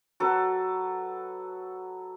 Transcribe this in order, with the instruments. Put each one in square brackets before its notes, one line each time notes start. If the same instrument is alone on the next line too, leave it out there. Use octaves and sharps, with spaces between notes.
[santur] F#3 A4 B4